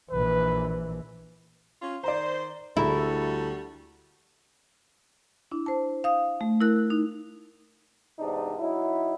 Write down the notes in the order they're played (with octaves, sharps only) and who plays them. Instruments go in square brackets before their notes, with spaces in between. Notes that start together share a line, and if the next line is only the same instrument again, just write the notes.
[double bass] A#1 E3 [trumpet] B4
[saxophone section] C#4 F4
[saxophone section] D#3 C5 [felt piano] D5 A#5
[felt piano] D2 G#4 A#5 [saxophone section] G3 F#4 A4 [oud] E4
[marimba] D4 E4
C5 A5
F5 D#6
A3
E4 A#4 F#6
D#4
[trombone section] E2 G#2 C3 D4 D#4
F#3 D#4 E4